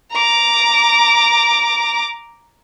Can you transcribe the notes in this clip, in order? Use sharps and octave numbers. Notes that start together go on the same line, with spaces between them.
A#5 D6